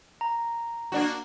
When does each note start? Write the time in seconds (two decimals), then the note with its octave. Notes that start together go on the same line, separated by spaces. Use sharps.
0.21 A#5
0.92 A#3 D4 F#4